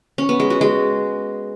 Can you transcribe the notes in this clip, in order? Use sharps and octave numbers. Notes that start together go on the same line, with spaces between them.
C#4
B3
G#3
F#4
G#3